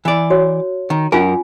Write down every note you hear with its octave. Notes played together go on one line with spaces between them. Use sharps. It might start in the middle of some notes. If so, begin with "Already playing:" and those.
E3 D5
F#4 C#5
D#3
F#2 C#4 F4 A#4 G#5